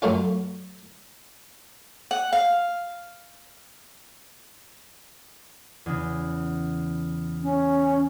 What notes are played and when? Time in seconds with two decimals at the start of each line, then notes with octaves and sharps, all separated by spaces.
0.02 F#2 F#3 A3 C#4 F4
2.11 F#5
2.33 F5
5.86 E2 C#3
7.43 C#4